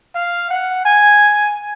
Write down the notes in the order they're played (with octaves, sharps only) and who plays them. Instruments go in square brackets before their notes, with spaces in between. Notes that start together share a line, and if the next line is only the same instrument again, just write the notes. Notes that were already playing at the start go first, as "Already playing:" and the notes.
[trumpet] F5
F#5
G#5